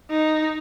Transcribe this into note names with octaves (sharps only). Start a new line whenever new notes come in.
D#4